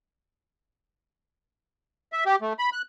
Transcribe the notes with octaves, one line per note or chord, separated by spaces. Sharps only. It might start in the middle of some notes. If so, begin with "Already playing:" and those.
E5
G4
A3
B5
F#6